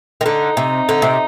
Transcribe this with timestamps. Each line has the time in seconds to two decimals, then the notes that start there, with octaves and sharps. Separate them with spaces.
0.21 D#3
0.25 D3 D#4
0.57 C3
0.89 D3
1.02 C3